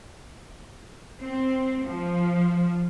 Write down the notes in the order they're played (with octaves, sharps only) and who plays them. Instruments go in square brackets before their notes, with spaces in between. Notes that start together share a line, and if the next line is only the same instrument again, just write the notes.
[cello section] C4
F3